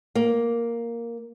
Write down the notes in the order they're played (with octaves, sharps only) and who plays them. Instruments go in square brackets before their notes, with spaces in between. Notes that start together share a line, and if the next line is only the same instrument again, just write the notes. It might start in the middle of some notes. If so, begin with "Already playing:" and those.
[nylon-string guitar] A#3